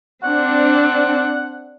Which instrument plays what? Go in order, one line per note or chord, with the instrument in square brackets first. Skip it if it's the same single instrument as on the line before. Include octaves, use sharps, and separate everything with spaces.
[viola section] C4 D4 [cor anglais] F#5